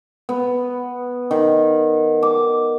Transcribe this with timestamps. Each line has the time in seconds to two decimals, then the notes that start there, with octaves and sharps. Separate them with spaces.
0.29 B3
1.31 D#3
2.23 D6